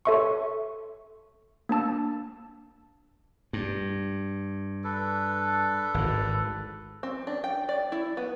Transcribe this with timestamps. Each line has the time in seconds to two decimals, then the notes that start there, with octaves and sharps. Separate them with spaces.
0.05 A4 C#5 E5 C6 C#6
1.69 A#3 D4 A5 E6
3.53 G2
4.84 D4 A4 B4
5.94 G#1 A2
7.03 C4
7.27 D4
7.44 G5
7.69 D5
7.92 E4
8.17 B3